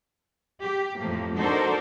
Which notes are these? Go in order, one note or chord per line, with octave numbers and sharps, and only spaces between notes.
G4
F2 A2 F3 A3 A#3
D4 D#4 F#4 A4 A#4 C5